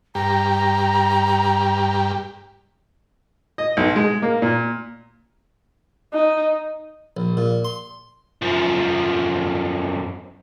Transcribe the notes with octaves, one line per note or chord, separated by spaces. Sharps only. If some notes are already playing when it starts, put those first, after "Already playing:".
G2 G4 A#5
D#5
B1
G#3
A#3
A#2
D#4
A#1
A#2
C6
F#2 F3